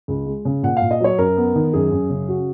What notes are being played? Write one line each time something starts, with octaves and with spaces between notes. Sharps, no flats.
C#2
G#3
C#3
A#2 F#5
F5
A#2
D#5
F#3 C#5
F#2 A#4
B3
D#3
F#2 G#4
F#2
C#3
F#4